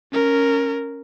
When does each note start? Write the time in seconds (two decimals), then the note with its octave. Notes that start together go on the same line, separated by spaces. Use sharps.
0.12 C#4 A#4